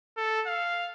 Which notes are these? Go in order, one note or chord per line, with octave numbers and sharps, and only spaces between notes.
A4
F5